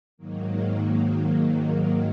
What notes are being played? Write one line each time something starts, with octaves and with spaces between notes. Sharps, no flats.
G#2 D#3 F#3 A#3